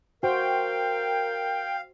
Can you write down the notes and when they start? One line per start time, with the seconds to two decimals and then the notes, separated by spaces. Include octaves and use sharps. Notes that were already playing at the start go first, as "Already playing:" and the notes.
0.23 F#4 A#4 C5 F5 G5